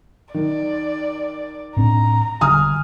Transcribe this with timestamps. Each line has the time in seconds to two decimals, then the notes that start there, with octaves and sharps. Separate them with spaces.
0.34 D#3 D5
1.77 A2 C4 D4 A#5
2.41 E1 D3 G3 G#5 D#6 F6